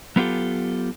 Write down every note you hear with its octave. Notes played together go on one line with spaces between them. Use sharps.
F#3 B3 F4 G4 A4